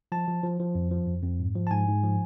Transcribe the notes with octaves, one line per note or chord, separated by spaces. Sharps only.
F3 A5
F3
F3
F3
F2
F3
F2
F2
G#2
F3
A5
G#2 G#5
G#2
F3